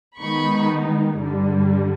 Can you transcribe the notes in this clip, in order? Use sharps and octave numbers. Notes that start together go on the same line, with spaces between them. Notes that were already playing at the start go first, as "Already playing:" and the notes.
D#3 G#3 B3 D#4 B5 C#6
G2 D3 G3